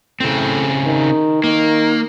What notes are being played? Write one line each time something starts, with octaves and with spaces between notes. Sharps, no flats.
A2 C#3 C4
D#3
D#3 A#3